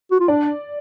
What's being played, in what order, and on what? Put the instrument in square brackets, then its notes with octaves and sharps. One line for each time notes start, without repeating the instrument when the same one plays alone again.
[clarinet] F#4
F4
[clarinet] D4 [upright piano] D5